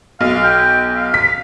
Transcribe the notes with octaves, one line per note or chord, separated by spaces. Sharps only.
B1 F5
G5
F5
B6